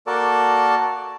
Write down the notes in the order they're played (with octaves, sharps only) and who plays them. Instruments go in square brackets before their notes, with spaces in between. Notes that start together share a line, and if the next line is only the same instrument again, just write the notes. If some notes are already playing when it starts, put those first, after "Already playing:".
[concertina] A#3 F#4 A4 A#4 D5 A5